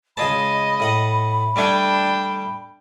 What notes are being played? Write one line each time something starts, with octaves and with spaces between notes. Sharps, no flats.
C#2 G#4 D#5 A5 B5
A2 F#5 D#6
G3 A3 D4 G5 G#5